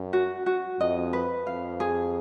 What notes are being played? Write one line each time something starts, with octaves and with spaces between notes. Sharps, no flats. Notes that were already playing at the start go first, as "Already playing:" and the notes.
Already playing: F#2
F#4
F#4
F2 D#5
B4
F2 F5
G#4